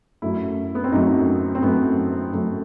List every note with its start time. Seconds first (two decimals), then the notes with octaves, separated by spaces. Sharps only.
0.22 F#2 F#3 A3 E4
0.75 B3
0.84 C4
0.92 F#2 F#3 A3 D#4
1.55 C4
1.62 F#2 F#3 A3 B3
2.33 F#2 F#3 A3